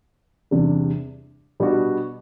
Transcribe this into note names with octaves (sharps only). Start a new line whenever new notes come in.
E2 C3 G3 D4
B2 G3 B3 D4 F#4